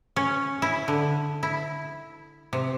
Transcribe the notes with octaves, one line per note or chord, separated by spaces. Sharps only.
C#4
E4
D3
E4
C3